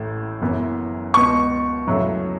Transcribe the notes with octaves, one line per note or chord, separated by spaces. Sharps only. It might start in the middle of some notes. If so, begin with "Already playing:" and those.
Already playing: A1 A2 A3
F#1 F#2 E3 B3
C#2 B2 B3 C#6
F#2 C#3 F#3 A3 E4